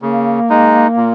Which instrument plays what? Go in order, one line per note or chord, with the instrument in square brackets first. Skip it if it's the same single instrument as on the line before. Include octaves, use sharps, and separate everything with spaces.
[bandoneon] C#3 [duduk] A#3
[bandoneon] G#3 D#4
A#2